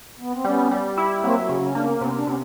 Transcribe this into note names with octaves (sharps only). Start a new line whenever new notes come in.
B3
C4
G3 B3 C#4
G3
E4
F#3 A#3 C4
C#3
C#4
A#3 D4
B3 C#4
C3 B3 C#4
D4
C3 B3 C#4